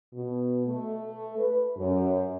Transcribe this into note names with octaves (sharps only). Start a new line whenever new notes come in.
B2
A3
B4
F#2